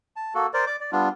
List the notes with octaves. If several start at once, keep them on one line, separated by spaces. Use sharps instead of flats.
A5
A#3 F#4 A4
A#4 C5 D5
D5 D6
D5
G3 B3 D4 F4